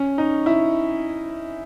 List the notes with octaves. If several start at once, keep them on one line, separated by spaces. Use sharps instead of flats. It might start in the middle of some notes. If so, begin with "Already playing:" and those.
Already playing: C#4
D#4
E4